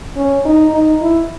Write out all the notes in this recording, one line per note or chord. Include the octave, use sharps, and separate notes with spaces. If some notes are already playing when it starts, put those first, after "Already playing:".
C#4
D#4
D#4
E4